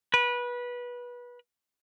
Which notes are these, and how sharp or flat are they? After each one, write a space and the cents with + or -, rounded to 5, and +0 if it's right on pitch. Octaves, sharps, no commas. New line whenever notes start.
B4 -20